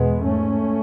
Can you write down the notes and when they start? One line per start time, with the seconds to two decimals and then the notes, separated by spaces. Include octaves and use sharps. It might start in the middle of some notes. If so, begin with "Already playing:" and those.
Already playing: E2 B2 G#3 B3
0.25 G#2 A3 C#4